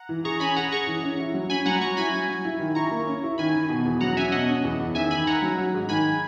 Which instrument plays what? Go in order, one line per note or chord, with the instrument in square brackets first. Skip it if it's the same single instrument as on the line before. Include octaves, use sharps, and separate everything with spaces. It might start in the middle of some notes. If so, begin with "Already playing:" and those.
Already playing: [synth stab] F#5 A#5
[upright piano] E3
[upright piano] G#4 [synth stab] A#5 C#6
[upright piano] C#4 [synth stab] G#5 B5
[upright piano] G#4 [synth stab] F#5 A#5
[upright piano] G#4 [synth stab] A#5 C#6
[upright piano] E3
C#4
E4
F#3
[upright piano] C#4 [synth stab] G#5 B5
[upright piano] F#3 [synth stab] F#5 A#5
[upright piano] F#3 [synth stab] A#5 C#6
[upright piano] E4 [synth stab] G#5 B5
[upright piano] F#3
F#3
E4
D#3
[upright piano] E4 [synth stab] A#5 C#6
[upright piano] A#3
C#4
E4
[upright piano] D#3 [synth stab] G#5 B5
[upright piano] D#3
B2
E2
[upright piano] F#3 [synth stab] F#5 A#5
[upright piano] C#4 [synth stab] E5 G#5
[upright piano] B2 [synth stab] D#5 F#5
[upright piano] C#4
E2
E2
[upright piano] D#3 [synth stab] E5 G#5
[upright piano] D#3 [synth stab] G#5 B5
[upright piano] D#3 [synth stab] F#5 A#5
[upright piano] F#3
F#3
G#2
[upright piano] D#3 [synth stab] G#5 B5